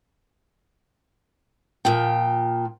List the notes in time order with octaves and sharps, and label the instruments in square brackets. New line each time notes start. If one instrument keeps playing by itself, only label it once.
[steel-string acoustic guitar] A#2 F3 G5